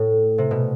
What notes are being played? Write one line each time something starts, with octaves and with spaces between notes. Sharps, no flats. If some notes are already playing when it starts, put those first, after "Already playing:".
Already playing: A2
C3
B2